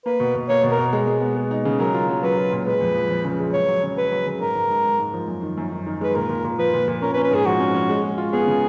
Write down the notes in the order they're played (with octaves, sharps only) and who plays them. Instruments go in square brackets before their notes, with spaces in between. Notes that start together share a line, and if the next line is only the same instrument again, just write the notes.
[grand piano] A#3 [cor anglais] B4
[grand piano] B2
B2
[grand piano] A#3 [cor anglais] C#5
[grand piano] B2
[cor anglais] A#4
[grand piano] B2
G#3
G#3
B3
G#3
D#4
C#3
[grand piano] F#3 [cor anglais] A#4
[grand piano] F4
F#3
[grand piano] F#3 [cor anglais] B4
[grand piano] F4
A#2
[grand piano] G#3 [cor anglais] B4
[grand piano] F2
F3
F3
C#3
G#3
[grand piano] F#3 [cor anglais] C#5
[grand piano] F#3
C#3
[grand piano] F#3 [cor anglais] B4
[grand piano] F#3
C#3
[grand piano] G#2 [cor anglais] A#4
[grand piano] G#2
G#2
G#2
G#2
F3
F#2
D#3
F#2
D#3
D#3
[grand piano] G#3 [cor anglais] B4
[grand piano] A#2 [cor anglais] A#4
[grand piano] A#2
A#2
[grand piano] F3 [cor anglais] B4
[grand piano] A#2
A#2
[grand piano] C#4 [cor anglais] A#4
[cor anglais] B4
[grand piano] C#4
[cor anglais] B4
[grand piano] G#2 [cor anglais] G#4
[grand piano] F3 [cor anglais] F#4
[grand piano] C#4
C#4
G#3
G#3
F4
[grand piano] B3 [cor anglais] G#4
[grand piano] C#3